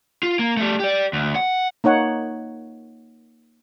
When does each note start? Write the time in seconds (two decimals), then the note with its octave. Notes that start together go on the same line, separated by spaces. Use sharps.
0.23 F4
0.39 A#3
0.57 G3 A3
0.80 G4 D5
1.13 D2
1.36 F#5
1.84 A#3 D#4 C#5 F#5